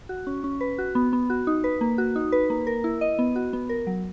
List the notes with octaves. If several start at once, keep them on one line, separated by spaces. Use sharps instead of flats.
F#4
C#4
C#4
B4
F#4
B3
B3
F#4
D#4
B4
A#3
F#4
D#4
B4
A#3
A#4
E4
D#5
B3
F#4
B3
A#4
F#3